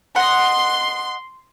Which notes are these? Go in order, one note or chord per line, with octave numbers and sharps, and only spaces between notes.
D#5 F#5 C6